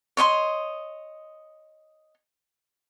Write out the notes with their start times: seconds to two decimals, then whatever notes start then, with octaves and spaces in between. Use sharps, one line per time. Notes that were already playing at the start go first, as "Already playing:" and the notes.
0.17 C#5 D#5 E5 C6